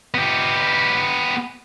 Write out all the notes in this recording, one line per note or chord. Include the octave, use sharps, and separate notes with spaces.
B3 G4